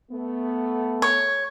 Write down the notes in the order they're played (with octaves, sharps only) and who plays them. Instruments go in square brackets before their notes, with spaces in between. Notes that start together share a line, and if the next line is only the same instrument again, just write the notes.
[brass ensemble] A3 B3
[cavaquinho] C#5